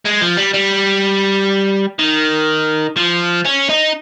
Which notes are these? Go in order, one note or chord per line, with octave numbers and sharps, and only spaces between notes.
G#3
F3
G3
G3
D#3
F3
C#4
D#4